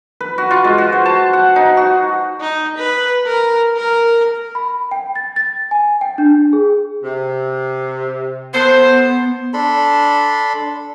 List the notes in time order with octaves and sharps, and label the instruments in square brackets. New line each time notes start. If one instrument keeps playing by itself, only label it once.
[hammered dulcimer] B4
F#4
F4
G#3
F#4
C5
A5
F#5
D#4
F#4
[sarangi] D#4
B4
A#4
A#4
[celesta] B5
G5
A6
A6
G#5
G5
D4
G#4
[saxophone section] C3
[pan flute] B3 [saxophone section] A4 B4 C5
[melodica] D4 A4 B5 C6